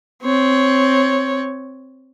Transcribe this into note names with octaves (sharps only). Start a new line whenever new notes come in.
C4 C#5